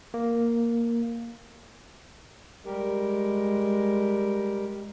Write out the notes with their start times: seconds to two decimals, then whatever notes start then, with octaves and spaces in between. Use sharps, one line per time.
0.14 A#3
2.65 G3 G#3 G4 A#4